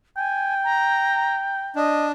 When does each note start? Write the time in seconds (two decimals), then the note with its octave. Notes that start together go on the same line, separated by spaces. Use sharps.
0.17 G5 G#5
0.64 A#5
1.76 D4 D#5